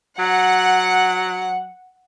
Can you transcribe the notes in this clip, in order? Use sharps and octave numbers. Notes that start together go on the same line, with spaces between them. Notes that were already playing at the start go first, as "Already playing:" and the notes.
F#3 F#5